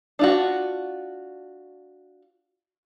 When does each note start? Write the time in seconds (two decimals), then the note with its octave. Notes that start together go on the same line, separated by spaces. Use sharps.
0.19 D4 F4 F#4